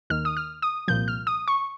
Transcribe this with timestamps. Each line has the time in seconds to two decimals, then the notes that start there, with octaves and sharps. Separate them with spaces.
0.10 D#2 D#3 F6
0.25 D#6
0.37 F6
0.62 D#6
0.88 C2 A#2 F3 G6
1.08 F6
1.27 D#6
1.48 C#6